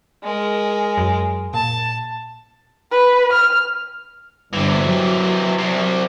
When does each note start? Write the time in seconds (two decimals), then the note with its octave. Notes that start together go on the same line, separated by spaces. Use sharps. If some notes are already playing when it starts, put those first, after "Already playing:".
0.24 G#3 A#4
0.98 F#2
1.54 A#2 A5
2.92 B4
3.33 F6
4.53 G1 C3 E3
4.83 F#3
5.59 C2 C3